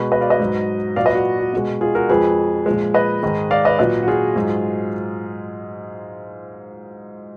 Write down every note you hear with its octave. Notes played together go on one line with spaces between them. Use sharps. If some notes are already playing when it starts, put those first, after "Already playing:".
Already playing: B2 G#3 B4
B4 D#5
D5 F5
B4 D#5
G#2 F#3
A#2 F#3 D5 F5
B4 D#5
F#4
F#4
B2 G#3
F4 G#4
F#4 A#4
F2 F3 G#3 G#4 B4
A#2 F3 G#3
B4 D#5
G#2 D#3 G#3
D5 F5
B4 D#5
A#2 F#3 B4 D#5
F#4
F4 G#4
G#2 F#3